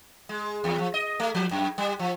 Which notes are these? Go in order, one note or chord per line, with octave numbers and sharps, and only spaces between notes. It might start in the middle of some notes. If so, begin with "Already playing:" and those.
G#3
E2
F3
D#5
A3
F3
F#2
G3
F3